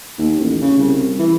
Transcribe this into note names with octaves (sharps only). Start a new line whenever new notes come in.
D#2
A1
C#3
C2
E3